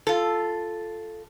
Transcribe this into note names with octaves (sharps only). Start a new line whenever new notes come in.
F4 A4